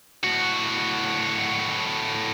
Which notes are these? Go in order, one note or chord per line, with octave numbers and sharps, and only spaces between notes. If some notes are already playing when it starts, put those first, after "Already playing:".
A2 F#4